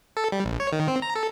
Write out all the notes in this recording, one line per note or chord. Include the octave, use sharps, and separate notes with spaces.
A4
G3
A#1
C#5
D#3
C4
A#5
A4